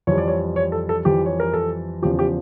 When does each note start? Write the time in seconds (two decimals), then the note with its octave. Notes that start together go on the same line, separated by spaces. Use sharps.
0.07 F2 E3 G3 C#5
0.18 D5
0.28 C#5
0.56 C#5
0.72 A4
0.89 A4
1.05 F2 E3 G3 G4
1.26 C#5
1.40 A#4
1.54 A4
2.02 E2 C#3 F3 G4
2.19 G4